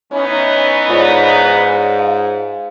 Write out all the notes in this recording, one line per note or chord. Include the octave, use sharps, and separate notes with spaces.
E3 B3 C#4 D#4
G#2 F4 C#5 D5
F5